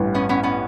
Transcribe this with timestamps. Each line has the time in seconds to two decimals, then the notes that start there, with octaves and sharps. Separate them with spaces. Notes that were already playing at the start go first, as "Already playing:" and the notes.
Already playing: A1 G2 E3
0.15 B3 C#4
0.29 B3 C#4
0.43 B3 C#4